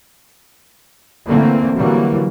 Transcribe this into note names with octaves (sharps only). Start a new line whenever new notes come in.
D3 E3 A3 A#3 C4
D3 E3 F#3 G3 A#3